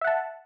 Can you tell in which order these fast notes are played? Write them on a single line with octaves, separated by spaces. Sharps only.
E5 F#5 A5